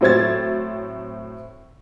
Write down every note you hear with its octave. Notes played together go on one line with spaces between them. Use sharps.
A2 F#3 C4 C5 G#6 A6